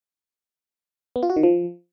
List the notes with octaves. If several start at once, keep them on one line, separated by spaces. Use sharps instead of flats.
B3
F4
F#4
D#3
F3